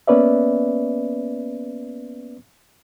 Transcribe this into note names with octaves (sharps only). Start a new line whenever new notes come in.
A#3 B3 C#4 B4 D5 E5